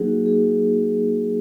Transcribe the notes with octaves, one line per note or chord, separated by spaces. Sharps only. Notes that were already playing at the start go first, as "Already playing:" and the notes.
Already playing: F#3 A#3 D#4 F#4 G#4
G#4